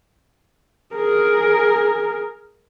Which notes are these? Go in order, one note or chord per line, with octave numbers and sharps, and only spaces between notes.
G#4 A#4